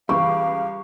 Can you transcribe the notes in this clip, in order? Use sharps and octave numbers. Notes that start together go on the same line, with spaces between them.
C#2 E3 G3 F5 C#6 D6